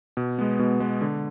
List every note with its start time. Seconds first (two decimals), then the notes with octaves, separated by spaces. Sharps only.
0.17 B2
0.38 G#3 B3
0.59 B2
0.80 G#3 B3
1.01 D3